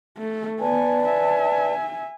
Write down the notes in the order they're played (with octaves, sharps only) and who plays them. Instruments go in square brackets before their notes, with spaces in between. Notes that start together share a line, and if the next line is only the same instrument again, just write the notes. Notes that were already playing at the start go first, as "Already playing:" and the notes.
[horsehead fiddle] A3
[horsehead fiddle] B3 G#5 [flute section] B4 D5 A5
[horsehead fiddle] E5 G#5